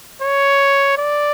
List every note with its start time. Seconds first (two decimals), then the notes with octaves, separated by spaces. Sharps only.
0.21 C#5
0.97 D5